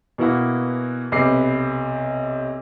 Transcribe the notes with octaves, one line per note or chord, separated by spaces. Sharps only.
B2 E3 A#3 E4 F#4
B1 C3 B4 D6 C7